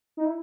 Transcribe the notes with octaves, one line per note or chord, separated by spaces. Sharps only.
D#4
E4